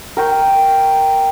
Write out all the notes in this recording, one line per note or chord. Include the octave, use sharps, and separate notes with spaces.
A#4 G5 C#6